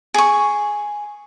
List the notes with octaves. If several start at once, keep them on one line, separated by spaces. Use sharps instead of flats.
G#4 C#6